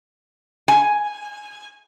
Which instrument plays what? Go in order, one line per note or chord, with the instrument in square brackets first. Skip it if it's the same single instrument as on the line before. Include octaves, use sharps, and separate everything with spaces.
[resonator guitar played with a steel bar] G#5